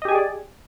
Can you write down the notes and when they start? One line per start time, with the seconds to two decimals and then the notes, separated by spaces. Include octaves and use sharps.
0.02 D#5
0.05 G4
0.08 G#5
0.12 G#4
0.15 D5